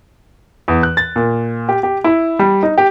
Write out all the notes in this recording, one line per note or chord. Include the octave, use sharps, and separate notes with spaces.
E2
F#6
A6
A#2
G4
G4
E4
G3
D#4
G4